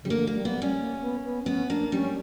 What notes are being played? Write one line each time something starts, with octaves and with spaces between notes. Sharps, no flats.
C#3 G3
D3 A#3
A#3
G3
A#3 B3
G3
C#4
A#3
B3
B3
B3 C#4
A#3 D4
G3 C#4